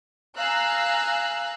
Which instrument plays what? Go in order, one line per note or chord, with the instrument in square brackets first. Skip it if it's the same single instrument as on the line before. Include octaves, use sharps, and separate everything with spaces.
[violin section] F5 G#5 A#5 E6 F#6